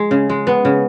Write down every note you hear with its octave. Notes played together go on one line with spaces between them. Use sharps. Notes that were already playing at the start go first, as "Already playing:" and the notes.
Already playing: G#3
C#3
G#3
B3
C#3